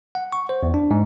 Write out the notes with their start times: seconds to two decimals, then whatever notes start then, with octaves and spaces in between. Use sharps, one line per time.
0.15 F#5
0.32 C#6
0.49 C5
0.63 E2
0.74 D4
0.91 G#2